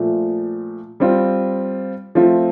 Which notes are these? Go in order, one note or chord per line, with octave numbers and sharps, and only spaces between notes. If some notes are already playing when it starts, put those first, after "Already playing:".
Already playing: A#2 F3 A3
G3 C4 F4
F3 A3 C4 F4